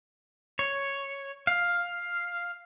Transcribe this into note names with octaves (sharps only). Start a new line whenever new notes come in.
C#5
F5